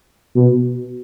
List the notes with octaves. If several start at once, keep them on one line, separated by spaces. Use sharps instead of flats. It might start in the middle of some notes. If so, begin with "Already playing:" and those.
B2